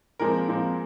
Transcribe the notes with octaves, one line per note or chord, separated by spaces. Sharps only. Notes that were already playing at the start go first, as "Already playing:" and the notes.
A#2 F3 G#3 C4 A#4
A#2 F3 G#3 C4